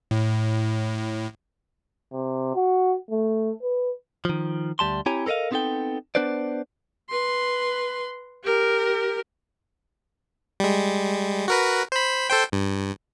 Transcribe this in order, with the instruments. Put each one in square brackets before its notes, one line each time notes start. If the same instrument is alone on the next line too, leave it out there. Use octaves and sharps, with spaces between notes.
[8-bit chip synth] A2
[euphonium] C3
F#4
A3
B4
[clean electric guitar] D#3 F3
D2 G3 A5 C6
C4 E4 G4 C#5 G#5 A#5
A4 A#4 C5 D#5 F5
B3 C4 D#4 F4 A4 G5
B3 D4 B4 C5 D5
[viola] B4 C6
G4 A#4
[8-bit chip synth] G3 G#3
F#4 A#4 B4
C5 B5
A4 C5 G5
G2